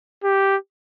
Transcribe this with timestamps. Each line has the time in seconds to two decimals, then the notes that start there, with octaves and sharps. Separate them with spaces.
0.24 G4